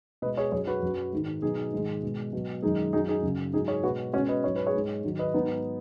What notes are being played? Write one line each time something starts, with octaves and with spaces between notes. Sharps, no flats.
B2 G#3 B4 D#5
G#4 C#5
F#2 F#3 G#4 C#5
F#4 B4
F#2 F#3
G#2 D#3 G#3
B2 F#3 D#4 G#4
G#2 D#3 G#3
B2 G#3
B2 F#3
F#2 D#3 G#3 D#4 G#4
F#2 F#3 D#4 G#4
D#4 G#4
F#2 C#3 F#3
G#2 F#3 D#4 G#4
G#4 C#5
B2 G#3 F#4 B4
B2 G#3 C#4 F#4
B4 D#5
G#2 F#3 C#5
B4
G#4 C#5
G#2 G#3
G#2 D#3 F#3
B4 D#5
G#2 F#3 B3 D#4